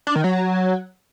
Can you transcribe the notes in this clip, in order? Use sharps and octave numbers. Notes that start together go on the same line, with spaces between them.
D4
D#3
F#3